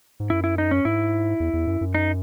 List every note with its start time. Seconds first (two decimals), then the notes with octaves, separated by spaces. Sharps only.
0.20 G#2
0.30 F#2 E4
0.44 E4
0.58 D#4
0.71 C#4
0.85 G#2 E4
1.40 E2
1.53 E2
1.67 F#2
1.81 F#2
1.95 D#4